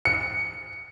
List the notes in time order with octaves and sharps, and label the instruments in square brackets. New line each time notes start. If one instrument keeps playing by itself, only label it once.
[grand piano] C#7